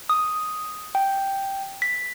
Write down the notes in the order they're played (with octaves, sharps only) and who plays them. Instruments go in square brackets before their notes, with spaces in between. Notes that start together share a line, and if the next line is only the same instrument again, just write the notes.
[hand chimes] D#6
G5
B6